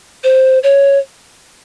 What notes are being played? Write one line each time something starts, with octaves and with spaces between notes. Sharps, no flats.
C5
C#5